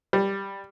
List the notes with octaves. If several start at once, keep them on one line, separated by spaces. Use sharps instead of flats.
G3